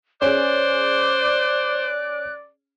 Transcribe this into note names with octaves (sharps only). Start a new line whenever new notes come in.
C#4 G#4 C5 D5 F#6